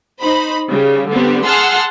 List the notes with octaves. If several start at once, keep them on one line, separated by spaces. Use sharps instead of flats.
D#4 C5 B5
C#3 G3
D3 G3 B3 C4
G#4 F#5 A5 C6 E6 F6